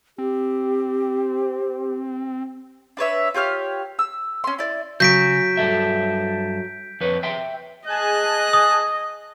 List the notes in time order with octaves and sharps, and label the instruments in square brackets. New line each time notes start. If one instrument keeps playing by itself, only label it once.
[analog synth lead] C4 [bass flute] G4
[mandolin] D4 B4 C#5 E5
F4 G4 C#5 F6
E6
C#4 C6
E4 D5
[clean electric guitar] C#3 [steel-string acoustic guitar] F#3 [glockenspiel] G6 B6 D7
[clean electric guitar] G2 A4 E5
F2 B4 C#5
E5 G5 C6
[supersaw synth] G#4 G#5 A5 [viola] D#5 [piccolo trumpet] F#6
[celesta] D#6